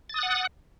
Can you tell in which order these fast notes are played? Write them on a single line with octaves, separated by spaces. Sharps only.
A6 D#6 F#6 F#5